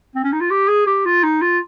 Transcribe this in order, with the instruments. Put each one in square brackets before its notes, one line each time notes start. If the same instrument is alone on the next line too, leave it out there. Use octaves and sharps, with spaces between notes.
[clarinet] C4
C#4
D#4
F4
G4
G#4
G4
F4
D#4
F4